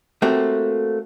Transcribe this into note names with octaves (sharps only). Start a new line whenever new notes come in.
A3 A#3 C4 F#4 G4